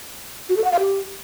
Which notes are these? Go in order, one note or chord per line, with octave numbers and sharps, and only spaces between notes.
F#4
A4
F#5
F5
G4